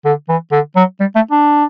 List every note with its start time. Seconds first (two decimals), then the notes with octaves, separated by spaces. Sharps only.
0.05 D3
0.29 E3
0.52 D3
0.76 F#3
1.00 G3
1.15 A3
1.31 D4